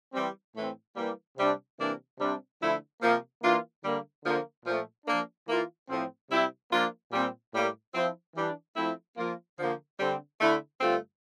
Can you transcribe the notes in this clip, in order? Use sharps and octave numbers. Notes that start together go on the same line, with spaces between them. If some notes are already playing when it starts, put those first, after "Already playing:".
E3 G3 C4
A2 E3 A3 C4
E3 G3 A#3
C3 G3 D4
C3 E3 A#3 D4
C3 G3 D4
D3 F3 A3 E4
C3 F3 A#3
E3 A#3 D4 F4
D3 G3 A#3
D3 F3 A#3
A#2 F3 A3
F3 A#3 D4
E3 A#3 F4
A2 F3 C4
C3 G3 C4 E4
F3 A#3 D4 F4
A#2 G3 C4
A2 G3 A#3
F3 C4 E4
E3 G3 D4
F3 A3 C4 E4
F3 A#3 F4
D3 F3 A#3
D3 G3 C4
D3 A3 E4
G2 D3 A3 C4 F4